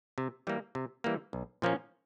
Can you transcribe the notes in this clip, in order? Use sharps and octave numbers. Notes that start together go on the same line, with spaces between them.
C3
E3 G3 A#3
C3
E3 G3 A#3
B1
A#2 F3 A#3 C#4